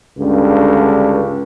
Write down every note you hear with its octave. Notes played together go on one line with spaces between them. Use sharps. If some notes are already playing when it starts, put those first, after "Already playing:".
C#2 G2 D3